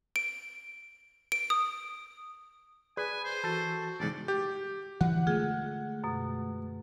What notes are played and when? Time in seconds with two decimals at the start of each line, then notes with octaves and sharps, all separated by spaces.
0.16 D7
1.32 D7
1.50 D#6
2.97 G#4 B4 D5 G#5 D#6
3.24 C5
3.44 E3 F#4 A4 A5
4.00 B1 G#2 C#3 E3 G#3 D5
4.28 G4 G6
5.01 D3 E3 F#5
5.27 G#3 A3 F4 G#4
6.04 F#2 B2